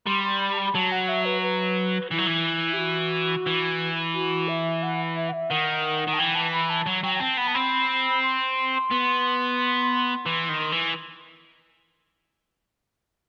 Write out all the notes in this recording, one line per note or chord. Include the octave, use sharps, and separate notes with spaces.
G3 C6
C6
B5
A5
B5
F#3 A5
F#5
E5
B4
B4
E3 E4
F#3
E3
G4
F#4
E3
F#4
E5
F#5
E5
F#5
E5
D#3 F#5
D#3
A5
E3 G5
A5
B5
A5
F#3
F#3 G5
G5
C4 A5
B3 B5
A5
C4 B5
C6
B3
E3
D#3
E3